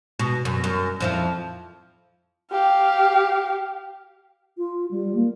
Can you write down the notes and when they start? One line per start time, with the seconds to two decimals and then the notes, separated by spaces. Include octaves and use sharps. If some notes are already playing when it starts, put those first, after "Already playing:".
0.19 B2
0.45 F#2
0.64 F#2
1.00 F2 F3 E4
2.52 G4 F5
4.57 F4
4.91 G3
5.15 A#3